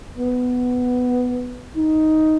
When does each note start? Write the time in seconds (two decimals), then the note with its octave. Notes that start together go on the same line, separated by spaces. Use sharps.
0.18 B3
1.76 D#4